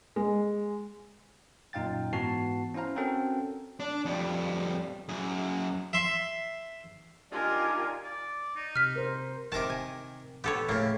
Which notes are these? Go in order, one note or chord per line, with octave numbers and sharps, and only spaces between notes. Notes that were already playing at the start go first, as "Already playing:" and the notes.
G#3
F#2 A#2 D#4 F5 G5 A6
G#2 E3 B3 F#4 A5 C7
C#4 E4 C5 F5 A#5
C4 C#4 F#4 A4 A#4 G5
D4
F2 G3
F#2 G#4
E5 C6
D4 D#4 F4 G4 A#4 D5 G#5
D5
D#4
C3 F6 B6
A#4 C5
C3 D#3 A#4 A5 D6
G#5
B3 G4 A4 C#5
A2 C#3 A#3